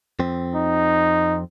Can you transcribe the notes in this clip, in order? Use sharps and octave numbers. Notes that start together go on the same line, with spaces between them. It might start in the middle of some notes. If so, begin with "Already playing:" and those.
F2 C4
D#4